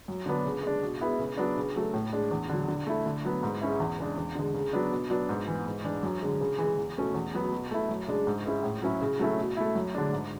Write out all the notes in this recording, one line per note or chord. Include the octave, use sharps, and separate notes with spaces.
F#2
D3 F#3 B3 D4
C#3
G#3 D4
B2
G#3 B3 E4
C#3
F#3 B3 D4
C#3
F#3 A3
A2
G#3 D4
E2
D3 F#3
D3
A3 E4
D3
F#3 B3
G#2
G#3 C#4 E4
E2
C#3 G#3 D4
E2
D3 G#3
C#3
F#3 B3 D4
B2
F#3 B3 D4
G#2
E3 B3
G#2
E3 G#3 D4
F#2
D3 G#3
C#3
E3 G#3
E2
B2 A3 C#4
E2
B2 F#3 B3
B2
A3 E4
F#2
C#3 G#3 D4
G#2
G#3 C#4 E4
A2
F#3 C#4 E4
C#3
F#3 A3 C#4 E4
B2
A3 E4
F#2
D3 G#3 D4
G#2